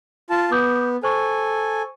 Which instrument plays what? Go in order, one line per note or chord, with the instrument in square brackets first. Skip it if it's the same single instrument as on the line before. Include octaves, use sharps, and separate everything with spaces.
[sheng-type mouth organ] F4 A5
[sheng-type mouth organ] B3 [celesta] D6 D#6 G6
[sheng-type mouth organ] A4 G#5 [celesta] C5 C#6